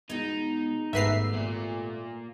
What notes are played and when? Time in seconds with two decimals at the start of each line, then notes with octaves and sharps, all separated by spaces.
0.10 B2 G#3 D#4
0.93 G#1 G3 A3 B3 B4 E5 A#5 C7
1.33 A#2